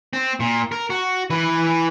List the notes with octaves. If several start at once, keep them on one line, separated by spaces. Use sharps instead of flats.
C4
A#2
A#4
F#4
E3 B4